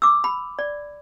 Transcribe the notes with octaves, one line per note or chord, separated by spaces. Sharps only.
D6 E6
B5
D5